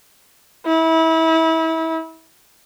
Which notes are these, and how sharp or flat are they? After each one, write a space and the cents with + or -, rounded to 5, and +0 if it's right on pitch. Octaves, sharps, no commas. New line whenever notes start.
E4 -30